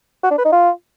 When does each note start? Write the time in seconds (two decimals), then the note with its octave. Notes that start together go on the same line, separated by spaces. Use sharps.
0.24 F#4
0.31 D4
0.38 B4
0.45 D#4
0.52 F4